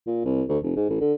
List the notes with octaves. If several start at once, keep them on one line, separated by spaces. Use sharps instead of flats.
A#2
C2
D2
F1
G#2
A1
D3